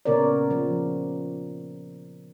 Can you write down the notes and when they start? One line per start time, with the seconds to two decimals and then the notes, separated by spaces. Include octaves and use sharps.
0.05 A#2 C#3 B3 A#4 C#5 D5
0.51 F3